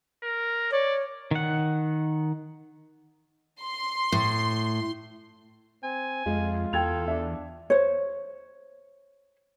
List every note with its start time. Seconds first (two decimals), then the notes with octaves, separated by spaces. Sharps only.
0.23 A#4
0.72 C#5 D5
1.31 D#3 F#5
3.62 C6
4.12 A2
5.83 C4 G#5
6.26 F2 G#3 F4
6.73 E2 A4 G5 G#6 F7
7.08 D4 E5
7.70 C5 C#5